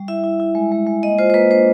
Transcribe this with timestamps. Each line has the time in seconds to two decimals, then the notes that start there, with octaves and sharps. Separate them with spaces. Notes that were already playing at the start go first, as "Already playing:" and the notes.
Already playing: G3
0.08 E4 E5
0.24 E4
0.40 E4
0.55 G#3
0.72 G#3
0.87 G#3
1.03 A#3 D#5
1.19 F4 C5
1.30 C5
1.34 A#3 B4
1.51 D4 C5